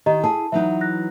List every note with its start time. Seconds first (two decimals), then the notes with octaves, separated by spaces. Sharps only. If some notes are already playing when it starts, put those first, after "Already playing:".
0.06 D#3 G4 D#5 A#5
0.24 E4 G#4 A5
0.52 E3 F#3 D#4 E5
0.81 F#6 A#6